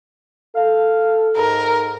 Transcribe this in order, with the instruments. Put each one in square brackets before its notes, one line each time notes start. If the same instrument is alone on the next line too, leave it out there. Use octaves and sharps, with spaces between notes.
[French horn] A4 [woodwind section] F5
[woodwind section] G#2 [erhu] A#4